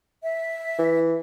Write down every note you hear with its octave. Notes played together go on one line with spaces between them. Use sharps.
E5
E3